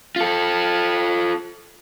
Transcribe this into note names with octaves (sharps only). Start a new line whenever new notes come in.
F4 A4